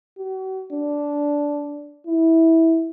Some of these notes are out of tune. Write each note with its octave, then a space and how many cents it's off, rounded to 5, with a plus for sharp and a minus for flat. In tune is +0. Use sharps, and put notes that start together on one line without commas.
F#4 +40
D4 -10
E4 -15